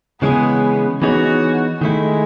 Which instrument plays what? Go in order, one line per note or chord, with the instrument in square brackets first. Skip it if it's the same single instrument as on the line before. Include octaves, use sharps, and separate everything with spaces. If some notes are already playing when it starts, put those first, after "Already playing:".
[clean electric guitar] C#3 E3 G#3 C#4 G#4 [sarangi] B3
[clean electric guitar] E3 B3 D#4 G#4 C#5 [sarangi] F#4
[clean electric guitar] D#3 A3 E4 [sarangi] G#3